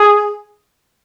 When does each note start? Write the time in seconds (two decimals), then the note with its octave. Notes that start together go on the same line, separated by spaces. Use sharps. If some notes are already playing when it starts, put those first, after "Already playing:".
Already playing: G#4